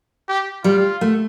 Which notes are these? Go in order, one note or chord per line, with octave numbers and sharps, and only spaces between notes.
G4
G3 F4
A3